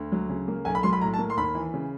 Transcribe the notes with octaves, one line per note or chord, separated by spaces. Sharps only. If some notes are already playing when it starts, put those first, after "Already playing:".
Already playing: D2
F#3
C#3
A#3
B1 G#5
B5
F#3 C6
B5
A2 A#5
A5
A#3
C6
D#2 B5
E3
C#3